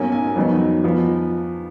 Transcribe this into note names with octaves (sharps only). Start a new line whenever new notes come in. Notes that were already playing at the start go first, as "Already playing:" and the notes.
Already playing: B1 B2 A#3 C#4 G#5
G#5
F2 D#3 F#3 B3 D#4
F2 F3 B3 D#4